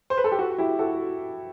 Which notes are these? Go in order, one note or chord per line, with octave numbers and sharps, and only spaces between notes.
C5
B4
A4
G4
F#4
E4 G4
F#4 A4